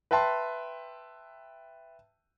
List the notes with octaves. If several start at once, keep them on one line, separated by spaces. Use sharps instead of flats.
B4 E5 G5 A5 C6